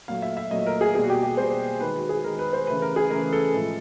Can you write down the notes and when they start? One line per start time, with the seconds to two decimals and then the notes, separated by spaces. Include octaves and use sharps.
0.08 A#2 F#3 A3 F5
0.22 E5
0.37 E5
0.51 A#2 F#3 A3 D#5
0.67 A#4
0.81 G#4
0.94 B2 G3 A#3 G#4
1.04 F#4
1.10 G4
1.23 G4
1.37 B2 G3 A#3 C5
1.81 D#3 G#3 B4
1.96 F#4
2.09 G#4
2.24 D#3 G#3 A#4
2.39 B4
2.53 C5
2.67 C#3 E3 A3 B4
2.82 A#4
2.96 G#4
3.10 C#3 E3 A3 A#4
3.33 A4
3.54 A2 F3 G#3